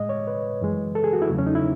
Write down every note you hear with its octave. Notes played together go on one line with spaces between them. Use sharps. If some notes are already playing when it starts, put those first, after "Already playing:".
Already playing: A2 G#3 D#5
C#5
B4
F#2 E3 G#3
A4
G#4
F#4
E4
E2 C#3 F#3 A3
C#4
D#4
E4